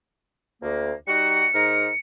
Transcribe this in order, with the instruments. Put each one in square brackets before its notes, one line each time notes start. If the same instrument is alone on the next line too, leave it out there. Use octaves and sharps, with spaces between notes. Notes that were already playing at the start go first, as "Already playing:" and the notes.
[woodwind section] D2 A#3
[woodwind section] G3 D#4 F#4 [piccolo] C#7
[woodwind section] G#2 D#4 A#4